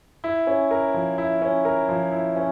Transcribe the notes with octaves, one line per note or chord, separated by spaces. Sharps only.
E4
C#4
A#4
F3
E4
C#4
A#4
F3
E4
C#4